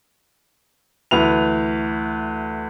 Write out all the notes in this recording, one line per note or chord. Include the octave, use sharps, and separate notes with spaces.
D2 E3 B4 F7